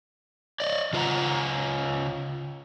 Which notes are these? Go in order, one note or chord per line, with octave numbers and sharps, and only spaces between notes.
D5 D#5
C#3 F4 A#4 D5 F#5 A#5